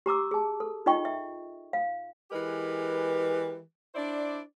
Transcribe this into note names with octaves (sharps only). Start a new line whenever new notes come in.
G4 A#5 D6 E6
G#4 A5
A4
D#4 F4 D#5 G5 C#6
E5
F5
E3 G#3 G4 A#4 B4
D4 E4 C5 D5